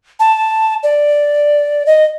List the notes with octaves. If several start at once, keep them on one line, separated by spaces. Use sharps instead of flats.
A5
D5
D#5